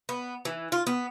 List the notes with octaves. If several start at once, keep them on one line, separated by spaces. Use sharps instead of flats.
B3
E3
F4
B3